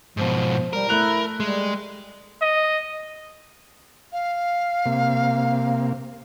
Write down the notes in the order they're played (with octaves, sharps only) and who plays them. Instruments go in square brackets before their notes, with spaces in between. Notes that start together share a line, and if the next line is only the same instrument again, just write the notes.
[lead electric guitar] G#2 B2 [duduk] F3
[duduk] G3 [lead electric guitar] A#4
[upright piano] A3 F#6 F7 [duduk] E4
[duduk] G3 [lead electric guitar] G#3
[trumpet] D#5
[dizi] F5
[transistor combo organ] C3 A#3